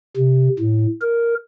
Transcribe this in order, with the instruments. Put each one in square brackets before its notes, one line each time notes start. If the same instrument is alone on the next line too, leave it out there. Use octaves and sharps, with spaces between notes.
[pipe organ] C3
A2
A#4